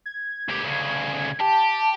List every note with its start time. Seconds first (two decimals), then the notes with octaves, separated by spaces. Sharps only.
0.06 G#6
0.49 D2 G4
0.64 D2 C#3
1.40 G4 A5